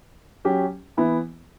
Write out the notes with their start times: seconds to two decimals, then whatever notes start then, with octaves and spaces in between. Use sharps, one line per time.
0.45 F#3 C#4 G4
0.97 E3 B3 E4